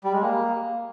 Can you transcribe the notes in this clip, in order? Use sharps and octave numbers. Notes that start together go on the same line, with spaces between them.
G3
G#3
A#3